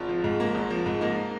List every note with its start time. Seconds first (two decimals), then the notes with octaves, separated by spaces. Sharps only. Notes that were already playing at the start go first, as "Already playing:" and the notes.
Already playing: G#1 F4
0.09 F3
0.24 G#2
0.40 A#3
0.55 G#1
0.70 F3
0.86 G#2
1.01 A#3 D#4